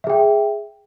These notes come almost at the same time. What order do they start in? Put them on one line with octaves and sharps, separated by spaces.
E5 G#4 G5